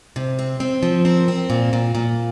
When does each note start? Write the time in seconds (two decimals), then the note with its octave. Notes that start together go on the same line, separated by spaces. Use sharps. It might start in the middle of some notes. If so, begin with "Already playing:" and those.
0.16 C3
0.39 C4
0.60 C4
0.83 F3
1.05 C4 A#4
1.28 C4
1.50 A#2
1.73 A#2
1.95 A#2